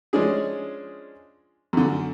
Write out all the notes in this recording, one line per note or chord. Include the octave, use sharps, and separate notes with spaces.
F3 G#3 C#4 D4 G#4
F#2 D3